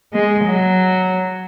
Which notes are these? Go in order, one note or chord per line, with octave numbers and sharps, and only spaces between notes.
G#3
F#3